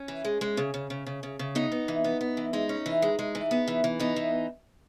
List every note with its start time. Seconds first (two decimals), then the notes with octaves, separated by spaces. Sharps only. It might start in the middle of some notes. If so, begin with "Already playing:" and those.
Already playing: C#4
0.08 E3
0.25 G#3
0.41 G#3
0.57 C#3
0.74 C#3
0.90 C#3
1.06 C#3
1.23 C#3
1.39 C#3
1.55 B3 D#4
1.72 B3
1.88 E3
2.04 B3
2.21 B3
2.37 E3
2.53 G#3 D#4
2.69 C#4
2.86 E3
3.02 G#3
3.19 G#3
3.35 E3
3.51 B3
3.68 E3
3.84 E3
4.00 B3 D#4
4.16 E3